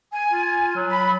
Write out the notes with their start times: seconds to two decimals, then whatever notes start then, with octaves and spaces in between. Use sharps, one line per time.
0.13 G#5
0.32 F4
0.76 F#3
0.90 B5